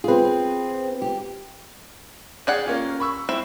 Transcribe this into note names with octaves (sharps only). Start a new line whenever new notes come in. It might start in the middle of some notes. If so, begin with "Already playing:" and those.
C4 F4 G#4 B4
G4
G4 G#4 D5 F#5
A#3 C#4 F4
B5 C#6 E6
C4 E4